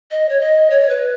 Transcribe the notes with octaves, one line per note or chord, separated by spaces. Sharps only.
D#5
C#5
D#5
C#5
B4